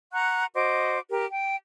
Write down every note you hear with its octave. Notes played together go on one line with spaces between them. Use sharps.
F#5 A#5 C#6 F#6
F#4 C5 D#5 D6
G4 A#4
G5